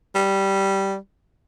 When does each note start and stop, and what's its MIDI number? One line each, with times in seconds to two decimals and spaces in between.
0.15 0.96 55